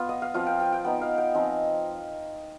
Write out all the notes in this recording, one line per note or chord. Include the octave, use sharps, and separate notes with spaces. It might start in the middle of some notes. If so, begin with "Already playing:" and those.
Already playing: B3 F4
D#5
F5
F3 C4 F4 F5
G5
G5
G5
B3 D#4 G5
F5
G5
F3 C4 D#4 G#5